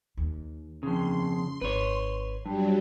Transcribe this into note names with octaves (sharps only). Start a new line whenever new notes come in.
D#2
F2 C#3 C6
G#1 B4 C#5
G2 F#3 G3